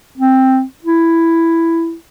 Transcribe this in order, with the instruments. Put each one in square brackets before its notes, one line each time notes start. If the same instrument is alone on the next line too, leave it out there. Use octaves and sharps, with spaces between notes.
[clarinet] C4
E4